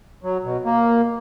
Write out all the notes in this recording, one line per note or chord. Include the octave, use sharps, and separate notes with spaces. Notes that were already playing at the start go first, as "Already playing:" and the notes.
F#3
B2
A#3